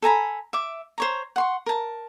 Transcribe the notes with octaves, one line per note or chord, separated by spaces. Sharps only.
A4 G#5 A#5 B5
E5 D6
C5 C#5 A#5
F#5 C6 C#6
A#4 A5